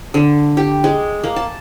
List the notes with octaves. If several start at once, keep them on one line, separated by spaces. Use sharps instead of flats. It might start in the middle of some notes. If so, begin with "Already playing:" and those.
D3
G4
G#3
A#3
A5